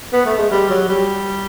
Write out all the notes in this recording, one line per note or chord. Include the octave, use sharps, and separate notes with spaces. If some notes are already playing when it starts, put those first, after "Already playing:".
B3
A3
G#3
G3
F#3
G3